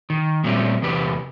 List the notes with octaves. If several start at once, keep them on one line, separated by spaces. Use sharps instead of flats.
D#3
A#2 F#3 G3 A3 C4
E2 C3 G4 B4